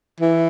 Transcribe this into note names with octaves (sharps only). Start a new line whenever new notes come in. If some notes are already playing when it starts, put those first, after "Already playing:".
E3